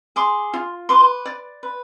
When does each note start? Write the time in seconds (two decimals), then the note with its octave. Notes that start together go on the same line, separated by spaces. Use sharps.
0.16 G#4 C6 D6
0.54 F4
0.89 B4 C6 D6
1.25 D5
1.63 B4